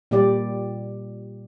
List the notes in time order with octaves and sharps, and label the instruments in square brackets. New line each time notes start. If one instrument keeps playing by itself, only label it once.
[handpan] A#2 G3 G4 D5